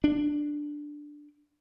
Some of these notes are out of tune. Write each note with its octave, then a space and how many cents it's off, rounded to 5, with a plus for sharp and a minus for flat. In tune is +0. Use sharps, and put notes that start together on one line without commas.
D4 +5